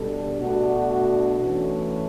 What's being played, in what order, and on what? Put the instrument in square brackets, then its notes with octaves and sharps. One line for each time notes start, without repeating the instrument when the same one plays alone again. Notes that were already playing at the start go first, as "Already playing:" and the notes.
Already playing: [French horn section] B2 G3 D4 A4
B2 A3 D4 F#4
E3 A3 C#4